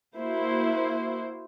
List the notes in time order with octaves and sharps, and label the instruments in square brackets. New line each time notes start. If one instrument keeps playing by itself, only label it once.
[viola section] A#3 E4 F#4 C5